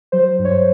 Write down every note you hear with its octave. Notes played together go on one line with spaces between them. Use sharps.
F#3 C5
G2
C#5
C5